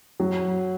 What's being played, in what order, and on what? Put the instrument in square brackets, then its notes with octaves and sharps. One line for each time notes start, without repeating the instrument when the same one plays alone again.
[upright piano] F#3